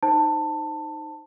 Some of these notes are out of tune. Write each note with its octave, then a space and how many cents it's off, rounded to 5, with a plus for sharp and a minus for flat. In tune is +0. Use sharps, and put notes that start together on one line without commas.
D#4 -5 C5 +0 A5 +15